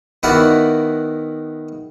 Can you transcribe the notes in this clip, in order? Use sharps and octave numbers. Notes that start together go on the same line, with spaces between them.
D#3 B3 E4 F#4 A#4 D5